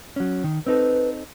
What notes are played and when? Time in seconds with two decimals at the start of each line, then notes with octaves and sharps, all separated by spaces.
0.16 F#3 C#4
0.44 D#3
0.66 C4 D#4 A4 B4